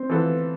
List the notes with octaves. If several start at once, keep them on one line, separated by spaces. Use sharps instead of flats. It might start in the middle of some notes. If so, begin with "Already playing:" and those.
Already playing: C4 C5
E3 B3 F4 A4